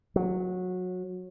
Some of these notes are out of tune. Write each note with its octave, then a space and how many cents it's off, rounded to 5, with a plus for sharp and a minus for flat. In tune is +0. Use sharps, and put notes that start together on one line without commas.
F#3 -20